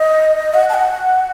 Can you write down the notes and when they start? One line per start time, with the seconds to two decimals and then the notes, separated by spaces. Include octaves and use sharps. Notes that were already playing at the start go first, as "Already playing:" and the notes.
Already playing: D#5
0.54 F#5
0.69 A5
0.74 F#5